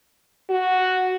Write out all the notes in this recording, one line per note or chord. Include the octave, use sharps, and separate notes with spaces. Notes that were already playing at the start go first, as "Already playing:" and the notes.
F#4